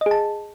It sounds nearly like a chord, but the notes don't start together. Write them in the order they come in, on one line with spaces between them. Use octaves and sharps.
D#5 G#4 A5